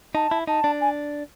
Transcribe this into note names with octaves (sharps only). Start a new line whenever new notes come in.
D#4 A5
E4
D#4 A5
D4
G#5